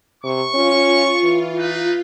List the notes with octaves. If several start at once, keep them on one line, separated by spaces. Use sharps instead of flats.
C3 C#6
C#4 F4
E3
D#4 B4